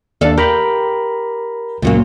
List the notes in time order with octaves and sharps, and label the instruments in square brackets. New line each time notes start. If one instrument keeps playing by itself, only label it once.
[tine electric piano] D#2 D4 [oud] A4 D5 F5
[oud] G4 [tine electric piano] A#4 A#5 B5
[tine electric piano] C#2 F#2 [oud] A#2 F#3 A#3